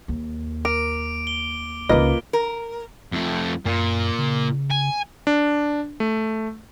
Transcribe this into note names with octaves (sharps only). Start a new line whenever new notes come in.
D#2
A#4 D6 D7
G7
C#2 A#3 D#4 F4 B4 D#5
A#4
F2 A3
F#2 A#2
C#3
G#5
D4
A3